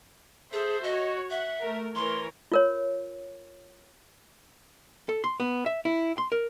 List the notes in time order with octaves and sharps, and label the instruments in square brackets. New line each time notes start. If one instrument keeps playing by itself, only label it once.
[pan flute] G#4 [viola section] A4 C5 E5
[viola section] F#4 C#5 [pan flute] D#5
[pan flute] E5 [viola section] F#5
[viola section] A3 A#4
[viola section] E3 A#4 C#5 [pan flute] C6
[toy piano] F4 A#4 C#5
[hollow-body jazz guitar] A4
C6
B3
E5
E4
C6
A#4